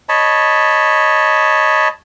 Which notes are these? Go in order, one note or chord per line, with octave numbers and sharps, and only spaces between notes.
C#5 D#5 A5 B5